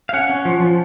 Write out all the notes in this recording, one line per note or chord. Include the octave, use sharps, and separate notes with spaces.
F5
C#4 F#5
C#4
F3
F3